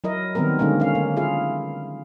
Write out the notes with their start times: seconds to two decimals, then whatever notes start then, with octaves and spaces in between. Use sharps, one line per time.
0.04 F#3 E4 A#4 D#5
0.35 D#3 G3 B3 C4 A#4
0.59 D3 G#3 A#3 C#4 D#4
0.80 C#4 F5
0.95 A#3
1.16 E4 F4 G#4 F5